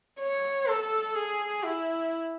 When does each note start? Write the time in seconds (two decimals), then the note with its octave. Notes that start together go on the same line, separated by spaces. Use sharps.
0.20 C#5
0.67 A4
1.15 G#4
1.63 E4